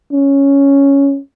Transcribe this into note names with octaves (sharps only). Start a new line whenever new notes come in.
C#4